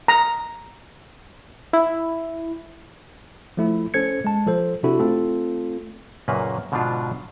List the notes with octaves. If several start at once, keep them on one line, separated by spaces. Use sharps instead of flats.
A#5
E4
F3 A3 E4
C#4 A4 C5 G#6 C#7
G#3 A5
F3 A4 C5
C3 D4 E4 F#4 A4
A3 C4 F4 A4
F#2 A#2 C#3 A#3 B4
G#2 B2 D3 F3 D4 F4